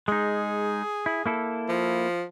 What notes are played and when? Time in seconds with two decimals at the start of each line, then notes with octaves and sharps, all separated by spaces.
0.08 G#3 D#4 G#4
1.06 E4
1.26 A#3 E4 A4
1.69 F3